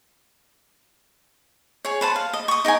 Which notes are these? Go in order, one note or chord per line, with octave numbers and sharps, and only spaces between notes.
G#4 C#5
B4 C5 A5
F5
D#5
C#6 D#6
D#4 A#4 G5 G#5